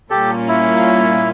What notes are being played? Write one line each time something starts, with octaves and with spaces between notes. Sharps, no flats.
A#2 G3 A#3 C#4 F4 G4 A4
E4